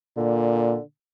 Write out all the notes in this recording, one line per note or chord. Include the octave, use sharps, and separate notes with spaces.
A#2 D3